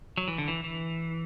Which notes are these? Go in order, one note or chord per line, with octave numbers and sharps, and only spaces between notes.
F#3
E3
D3
E3
E3